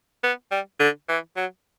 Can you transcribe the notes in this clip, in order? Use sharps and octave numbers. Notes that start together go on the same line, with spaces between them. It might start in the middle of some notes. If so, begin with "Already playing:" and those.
B3
G3
D3
E3
F#3